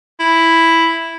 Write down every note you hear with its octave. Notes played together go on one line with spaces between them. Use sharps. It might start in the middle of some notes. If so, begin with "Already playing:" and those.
E4